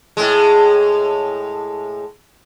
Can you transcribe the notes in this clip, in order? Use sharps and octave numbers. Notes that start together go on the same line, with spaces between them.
A2 G#3